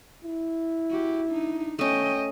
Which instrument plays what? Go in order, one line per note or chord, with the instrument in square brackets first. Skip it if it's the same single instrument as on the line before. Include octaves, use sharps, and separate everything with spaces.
[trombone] E4
[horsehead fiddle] F#4 G4
D4 D#4
[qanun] A3 C#4 [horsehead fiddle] D#5 G5